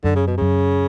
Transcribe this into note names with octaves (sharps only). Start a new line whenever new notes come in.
F#2 D3
C#3
B2
F#2 C#3